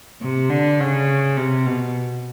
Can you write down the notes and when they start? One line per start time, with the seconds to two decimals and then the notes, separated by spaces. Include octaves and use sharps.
0.22 C3
0.49 D3
0.79 C#3
1.37 C3
1.66 B2